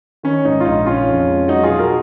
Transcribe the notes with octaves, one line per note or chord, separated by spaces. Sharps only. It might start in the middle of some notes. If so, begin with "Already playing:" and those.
D#3 C#4
G#2 D#4
F4
A#1 D#4
C#3 C#4 F4
F2
G#3
F#3 D#4 F#4
F4 G#4
B2
F#4 A#4